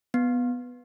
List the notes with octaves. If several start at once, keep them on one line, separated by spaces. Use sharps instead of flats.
B3